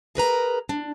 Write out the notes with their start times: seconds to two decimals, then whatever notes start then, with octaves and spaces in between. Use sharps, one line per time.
0.15 G#4 A#4 B4 A#5
0.69 D4